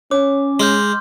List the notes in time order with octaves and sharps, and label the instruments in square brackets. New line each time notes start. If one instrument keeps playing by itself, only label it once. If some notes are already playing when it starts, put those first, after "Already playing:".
[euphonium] C#4 [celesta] C#5 [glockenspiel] D6
[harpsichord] G#3 [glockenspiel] C6 F6 G6